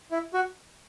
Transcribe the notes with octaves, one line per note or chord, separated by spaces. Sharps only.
E4
F#4